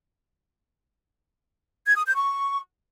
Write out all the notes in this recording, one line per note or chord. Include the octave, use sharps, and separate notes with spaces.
G#6
D#6
G6
C#6